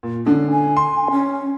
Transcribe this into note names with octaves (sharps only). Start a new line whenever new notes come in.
A#2
D3 C#4
G#5
C6
C#4